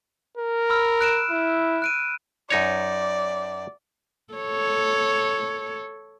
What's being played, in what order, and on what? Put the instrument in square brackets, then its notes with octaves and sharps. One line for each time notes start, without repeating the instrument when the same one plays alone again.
[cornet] A#4
[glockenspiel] B5 E6 F6
F#6 D7 E7
[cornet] E4
[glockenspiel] F#6 D7 D#7
[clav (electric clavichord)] F#2 D#4 C#5 [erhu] D5
[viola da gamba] A4 C#5